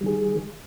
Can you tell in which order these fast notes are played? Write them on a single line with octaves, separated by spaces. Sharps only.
G3 D#3 G#4